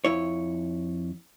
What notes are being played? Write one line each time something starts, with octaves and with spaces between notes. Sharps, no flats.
F2 E4 C#5